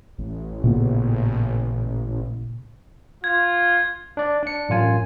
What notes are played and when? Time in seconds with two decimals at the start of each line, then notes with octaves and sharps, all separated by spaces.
0.18 A1
0.64 A#2 C#3 B3
3.24 F4 G#6
4.17 D4 D5
4.43 D4 C#7
4.69 A1 F#2 F4 G#5